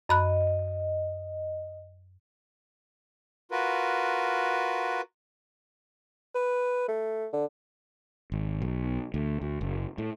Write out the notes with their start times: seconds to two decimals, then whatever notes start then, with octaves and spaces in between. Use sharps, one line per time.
0.09 F#2 D#5 B5 F#6
3.51 F4 F#4 A#4 B4
6.35 B4
6.88 A3
7.33 D3
8.32 G#1
8.62 B1
9.14 D2
9.41 D2
9.61 F#1
9.98 A2